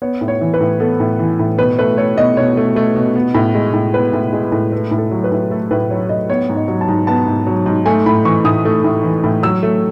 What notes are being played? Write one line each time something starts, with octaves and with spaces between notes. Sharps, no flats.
B3 C#5
A2
C#5
E3
B4
A2
B3 A4
A2
E3
A2
B2 B4
A3 B4
A3 C#5
B2 D#5
B2 C#5
A3
A3
B2
B3
A2
G#3
A2
B3 B4
A2
G#3
A2
A3 B4
A2
A4
F#3
B4
A2
A3 A4
A2 B4
F#3 C#5
A2 D#5
B3 C#5
G#2
D#5
F#3
A5
G#2
B3 A5
G#2
F#3
G#2
A3 G#5
A2 B5
E3 C#6
A2 D#6
A3
A2
E3
A2
F#3 E6
A3